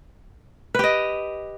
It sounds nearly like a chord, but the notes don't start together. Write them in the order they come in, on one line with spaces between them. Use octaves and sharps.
B4 G4 D#5